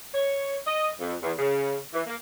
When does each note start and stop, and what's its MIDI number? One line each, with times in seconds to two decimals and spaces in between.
0.14 0.57 73
0.67 0.89 75
1.00 1.14 41
1.22 1.33 40
1.38 1.77 49
1.94 2.01 52
2.07 2.15 58